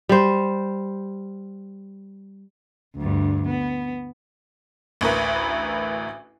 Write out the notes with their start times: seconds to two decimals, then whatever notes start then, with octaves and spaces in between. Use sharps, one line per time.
0.09 G3 C5
2.97 D2 G2
3.49 B3
5.01 A1 D2 A#4 B4